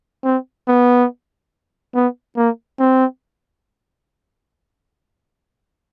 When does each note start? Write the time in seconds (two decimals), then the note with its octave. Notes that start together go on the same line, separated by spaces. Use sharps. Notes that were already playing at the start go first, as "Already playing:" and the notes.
0.24 C4
0.68 B3
1.95 B3
2.37 A#3
2.79 C4